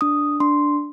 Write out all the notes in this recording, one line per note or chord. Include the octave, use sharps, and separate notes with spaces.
D4 D#6
D4 C6